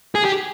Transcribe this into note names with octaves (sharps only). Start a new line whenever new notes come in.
G#4
G4